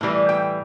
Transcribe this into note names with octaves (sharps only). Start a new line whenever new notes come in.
A2 E3 G3
G5